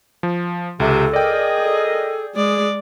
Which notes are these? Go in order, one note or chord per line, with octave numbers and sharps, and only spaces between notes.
F3
C#2 C3 A4
G#4 A#4 D5 D#5 G5
A4
G#3 G#4 D5